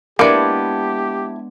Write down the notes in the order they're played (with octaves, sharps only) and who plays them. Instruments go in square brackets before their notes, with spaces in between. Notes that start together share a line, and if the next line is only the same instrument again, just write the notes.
[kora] G#3 B3 D4 [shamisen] A#3 D5 [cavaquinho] E4 A5 [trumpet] G4